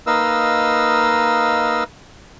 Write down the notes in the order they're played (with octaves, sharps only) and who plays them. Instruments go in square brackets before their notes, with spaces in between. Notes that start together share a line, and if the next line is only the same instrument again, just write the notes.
[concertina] A#3 D#4 B4 D#5 F5 E6